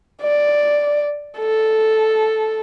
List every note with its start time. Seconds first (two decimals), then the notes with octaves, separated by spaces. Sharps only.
0.22 D5
1.39 A4